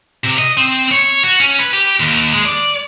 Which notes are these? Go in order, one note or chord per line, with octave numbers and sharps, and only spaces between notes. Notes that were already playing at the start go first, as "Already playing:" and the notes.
C3
D#5
C4
C#5
F#4
C#4
B4
G4
D#2
G#3
D5